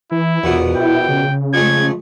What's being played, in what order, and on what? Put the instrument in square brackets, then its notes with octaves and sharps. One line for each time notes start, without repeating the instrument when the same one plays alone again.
[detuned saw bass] E3 [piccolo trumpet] E4
[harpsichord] A#1 B2 B3 [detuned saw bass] E2
[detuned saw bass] E4 [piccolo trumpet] G5
[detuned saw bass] C#3
[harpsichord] F2 G#3 A3 [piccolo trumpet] G#6